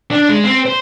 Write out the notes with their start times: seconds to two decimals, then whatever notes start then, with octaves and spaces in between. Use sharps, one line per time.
0.11 D4
0.30 G#3
0.44 C4
0.66 C5